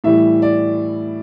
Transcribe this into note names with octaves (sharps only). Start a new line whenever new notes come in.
A2 E3 G3 E5
D5